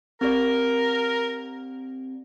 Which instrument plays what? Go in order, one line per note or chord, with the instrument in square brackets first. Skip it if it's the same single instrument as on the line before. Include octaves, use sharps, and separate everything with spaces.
[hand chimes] C4 G4 D5 [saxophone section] A#4